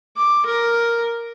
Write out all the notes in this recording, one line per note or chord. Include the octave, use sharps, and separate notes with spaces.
D6
A#4